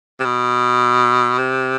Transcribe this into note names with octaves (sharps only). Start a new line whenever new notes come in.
C3
B2
C3